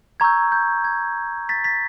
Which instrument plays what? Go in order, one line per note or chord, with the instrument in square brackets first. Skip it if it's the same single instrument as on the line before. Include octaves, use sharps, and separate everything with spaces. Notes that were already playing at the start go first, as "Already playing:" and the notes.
[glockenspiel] A#5 C#6 E6 G6 G#6
G6
G#6
A6 B6
A6 B6